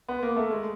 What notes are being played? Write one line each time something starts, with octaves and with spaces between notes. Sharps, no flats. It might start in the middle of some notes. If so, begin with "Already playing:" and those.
B3
A#3
A3
G#3